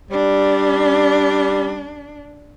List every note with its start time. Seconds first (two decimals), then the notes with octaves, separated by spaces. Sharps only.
0.11 G3 D4